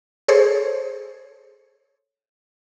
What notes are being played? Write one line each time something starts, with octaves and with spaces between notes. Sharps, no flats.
G#4 A4 C5 C#5